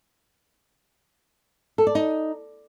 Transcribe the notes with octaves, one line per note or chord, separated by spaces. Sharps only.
A4
D5
D#4